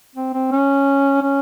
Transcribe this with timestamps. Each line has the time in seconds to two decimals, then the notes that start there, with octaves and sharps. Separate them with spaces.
0.15 C4
0.34 C4
0.52 C#4
1.23 C#4